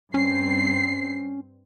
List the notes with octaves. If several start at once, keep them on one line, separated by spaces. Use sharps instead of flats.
G2 C4 C#4 C7